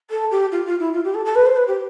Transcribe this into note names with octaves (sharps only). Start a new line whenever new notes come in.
A4
G4
F4
F4
E4
F4
G4
A4
A4
B4
C5
B4
G4